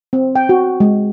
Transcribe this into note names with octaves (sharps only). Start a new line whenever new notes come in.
C4
G5
F#4
G#3